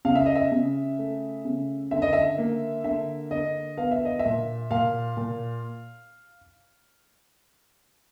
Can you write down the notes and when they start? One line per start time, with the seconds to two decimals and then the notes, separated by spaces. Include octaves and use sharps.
0.05 C#3 F5
0.15 E5
0.26 D#5
0.35 E5
0.52 C#3
0.98 A3
1.45 C#3
1.91 D3 E5
2.02 D#5
2.13 E5
2.38 A#3
2.84 D3 E5
3.31 D3 D#5
3.77 B3 F5
3.91 E5
4.05 D#5
4.19 E5
4.25 A#2
4.71 A#2 F5
5.17 A#2